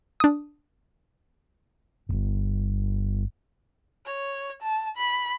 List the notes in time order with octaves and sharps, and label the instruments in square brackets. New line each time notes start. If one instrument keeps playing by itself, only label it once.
[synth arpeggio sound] D4 D#6
[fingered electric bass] D1 G1
[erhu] C#5
A5
B5